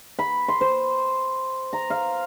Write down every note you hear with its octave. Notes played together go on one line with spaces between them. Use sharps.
B5
C6
C5
A#5
F5